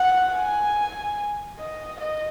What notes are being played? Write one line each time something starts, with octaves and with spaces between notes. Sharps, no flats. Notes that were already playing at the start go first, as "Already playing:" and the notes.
Already playing: F#5
G#5
D#5
D#5